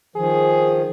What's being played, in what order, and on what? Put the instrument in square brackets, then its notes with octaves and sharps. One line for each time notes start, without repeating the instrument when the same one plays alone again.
[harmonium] D#3 F3 [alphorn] G#4